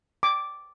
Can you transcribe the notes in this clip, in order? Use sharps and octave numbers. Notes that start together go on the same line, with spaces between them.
D6